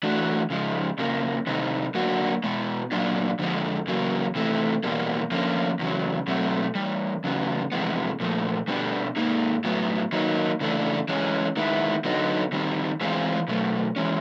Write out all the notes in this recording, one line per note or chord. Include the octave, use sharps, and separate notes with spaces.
E3 A3 D4 F#4
C#3 F3 G#3
F2 C#3 F3 A#3
C3 D#3 G3 C4 D#4
D3 F#3 A#3 D4 F#4
B2 G#3 B3
A#2 F#3 A#3 D4 F4
F2 D3 F3 G#3
E2 C#3 F#3 A#3
C3 E3 A3
E2 B2 G3 A#3
D3 F3 A#3 C#4
E2 C#3 F#3
B2 F#3 A3 C4
E2 B2 G3
E2 C#3 F#3 B3
F2 C3 E3 G#3 B3
A#2 F3 A3
B2 G3 B3 D4 G4
G#2 F3 A#3 D#4 G#4
A2 F#3 B3
D#3 F#3 A#3 D#4
C#3 E3 A3 D4
E3 G#3 C#4 F4 G#4
D#3 G#3 B3 E4
D3 F#3 B3 D#4
D#3 G3 C4
E3 G#3 C4 F4 G#4
B2 F#3 A3
E3 G#3 C#4